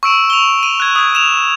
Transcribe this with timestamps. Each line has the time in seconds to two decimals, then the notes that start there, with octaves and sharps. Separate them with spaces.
0.03 C#6 E6 D7 E7
0.30 F7 G7
0.63 D#7
0.80 F#6 G#6 F7
0.95 D#6 G#6
1.15 E7 F7